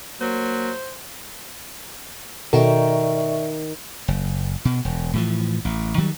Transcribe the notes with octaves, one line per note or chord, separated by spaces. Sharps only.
F#3 A#3 C5
B2 D#3 F#4 A4 D5 E5 C#6
F#1
B2
E1
A2 E3 F3
A1
D#3 F#3 G3